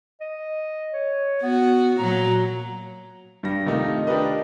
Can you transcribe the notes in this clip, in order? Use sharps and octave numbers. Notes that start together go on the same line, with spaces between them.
D#5
C#5
B3 F#4
A#2 F#3 A#5
G2 G3 A#6
C3 D#3 A3 D#4 F4
D4 G4 A#4 B4 D#5